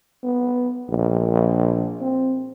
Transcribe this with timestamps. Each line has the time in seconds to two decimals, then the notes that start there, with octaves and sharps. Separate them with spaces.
0.23 B3
0.90 A#1
2.01 C4